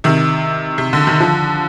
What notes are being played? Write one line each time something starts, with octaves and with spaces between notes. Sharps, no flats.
C3 D#3
C3
D3
D#3
D3 F3